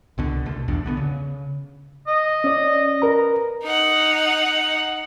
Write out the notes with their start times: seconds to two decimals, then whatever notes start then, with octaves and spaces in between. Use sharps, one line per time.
0.18 C2 B2 D3
0.46 C2 B2 A3
0.68 B1 E2 A2 D4
0.84 C#2 D3 F#3 B3
0.97 C#3
2.08 D#5
2.44 C#4 D5
3.02 A#4 B4 A#5
3.63 D#4 F#5